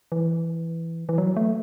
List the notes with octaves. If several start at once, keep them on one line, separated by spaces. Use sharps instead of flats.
E3
E3
F#3
A3